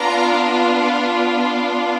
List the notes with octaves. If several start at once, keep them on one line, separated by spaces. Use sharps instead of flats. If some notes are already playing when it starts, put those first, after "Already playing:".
Already playing: B3 D4 F4 A#5